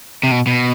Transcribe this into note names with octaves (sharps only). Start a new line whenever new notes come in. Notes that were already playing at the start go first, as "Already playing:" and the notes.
C3
B2
B2